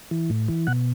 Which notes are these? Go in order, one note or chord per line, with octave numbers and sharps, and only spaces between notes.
E3
A2
E3
B2 F#5